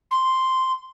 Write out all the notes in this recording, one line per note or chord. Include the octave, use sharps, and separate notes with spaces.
C6